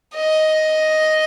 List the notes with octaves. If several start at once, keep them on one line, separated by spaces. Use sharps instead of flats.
D#5